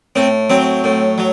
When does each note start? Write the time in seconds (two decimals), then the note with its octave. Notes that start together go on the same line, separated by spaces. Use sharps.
0.16 A2 C4
0.50 F#3 C4
0.84 A2
1.18 F#3